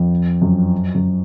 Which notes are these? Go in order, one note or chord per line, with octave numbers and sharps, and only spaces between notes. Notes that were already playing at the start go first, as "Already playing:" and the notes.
Already playing: F2
F#2
F#2